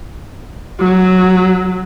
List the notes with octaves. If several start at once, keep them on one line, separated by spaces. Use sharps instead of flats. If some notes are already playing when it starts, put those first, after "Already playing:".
F#3